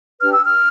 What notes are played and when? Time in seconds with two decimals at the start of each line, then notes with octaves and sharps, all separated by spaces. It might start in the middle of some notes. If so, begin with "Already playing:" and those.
0.20 D4 G4 B4 F6
0.31 E6
0.44 F6